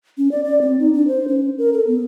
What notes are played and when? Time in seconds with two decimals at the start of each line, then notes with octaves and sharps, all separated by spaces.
0.18 C#4
0.32 D5
0.44 D5
0.61 C4
0.80 D#4
0.93 D4
1.08 C5
1.28 C#4
1.58 A#4
1.73 A4
1.87 B3